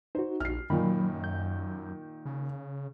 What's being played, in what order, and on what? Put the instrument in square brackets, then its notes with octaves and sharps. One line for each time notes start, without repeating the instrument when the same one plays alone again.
[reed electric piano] D#4 F#4 [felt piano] C5
[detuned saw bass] A#1 [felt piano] F6 C7
[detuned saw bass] F#2 [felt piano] A#2 D#3 [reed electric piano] F#3 B5
[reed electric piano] G6
[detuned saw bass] C#3